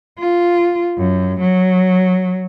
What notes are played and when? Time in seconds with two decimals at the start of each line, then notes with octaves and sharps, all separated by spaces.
0.19 F4
0.98 F#2
1.40 F#3